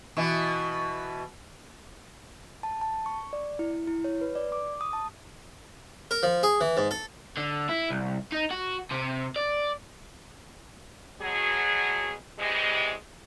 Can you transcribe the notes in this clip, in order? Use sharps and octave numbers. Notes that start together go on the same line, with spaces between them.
B2 E3
A5
A5
C#6
D5
E4
E4
C#5
B4
D5
D6
D#6
A5
A#4
F3
G#4
E3
G#2
A4
D3
E4
C2
D#4
F#4
C3
D5
B2 F#3 G#4
C3 E3 G3 G#3